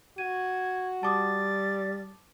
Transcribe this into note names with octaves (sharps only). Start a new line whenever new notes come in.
F#4 G#6 D#7
G3 A5 D6 D#6 A6